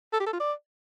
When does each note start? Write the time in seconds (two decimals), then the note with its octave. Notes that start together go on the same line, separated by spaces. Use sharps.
0.13 A4
0.20 G4
0.26 A4
0.33 F4
0.40 D5